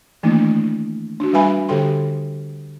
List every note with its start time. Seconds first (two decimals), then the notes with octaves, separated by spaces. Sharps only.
0.23 D#3 E3 A3 A#3 D4 E4
1.20 D4 F#4
1.33 G3 B4 E5 G#5 B5
1.69 D3 G4 A4 G5 C6